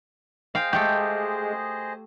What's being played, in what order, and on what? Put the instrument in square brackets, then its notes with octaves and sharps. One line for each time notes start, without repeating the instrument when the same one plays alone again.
[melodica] G#4 C5 D#5 [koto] F5 G5
[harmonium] G#3 [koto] A3 G4 [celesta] G6